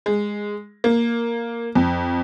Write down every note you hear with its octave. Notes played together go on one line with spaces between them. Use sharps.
G#3
A#3
F2